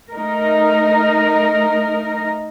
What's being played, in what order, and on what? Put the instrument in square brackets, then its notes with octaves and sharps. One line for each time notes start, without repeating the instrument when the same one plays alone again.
[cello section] A3 D#4 A#4